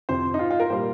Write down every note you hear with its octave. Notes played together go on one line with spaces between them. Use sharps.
F2 C3 F3 C5
D#4
F4
F4
A#4
A#2 G3 C5